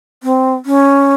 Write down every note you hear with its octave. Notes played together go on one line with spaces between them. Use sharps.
C4
C#4